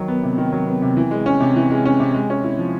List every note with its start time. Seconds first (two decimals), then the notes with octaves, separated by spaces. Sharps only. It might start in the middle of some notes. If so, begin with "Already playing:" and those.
Already playing: D#3 F#3
0.08 B3
0.23 C3
0.38 D#3
0.53 F#3
0.67 B3
0.82 C3
0.97 E3
1.11 G#3
1.26 C#4
1.40 C3
1.56 E3
1.71 G#3
1.85 C#4
2.00 C3
2.14 G#3
2.30 C#4
2.44 E4
2.59 F3